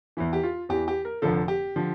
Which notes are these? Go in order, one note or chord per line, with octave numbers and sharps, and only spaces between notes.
E2 E3 E4
G4
F4
E2 E3 G4
G4
A#4
F1 F2 D3 F3 A4
G4
D3 F3